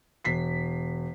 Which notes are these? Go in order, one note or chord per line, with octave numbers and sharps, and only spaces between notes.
E1 B6 C7